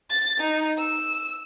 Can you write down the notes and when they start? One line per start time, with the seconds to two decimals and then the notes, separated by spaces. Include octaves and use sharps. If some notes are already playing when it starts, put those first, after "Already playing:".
0.10 A6
0.40 D#4
0.78 E6